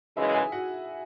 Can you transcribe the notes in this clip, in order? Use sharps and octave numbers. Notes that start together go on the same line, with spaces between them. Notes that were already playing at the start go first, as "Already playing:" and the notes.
F#2 C#3 E3 G#3 E4 E5
G#4 G#5
F#4 F#5